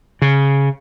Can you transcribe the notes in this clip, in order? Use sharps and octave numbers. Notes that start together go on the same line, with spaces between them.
C#3